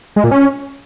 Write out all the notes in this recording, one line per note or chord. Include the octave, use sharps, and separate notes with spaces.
G#3
A#2
C#4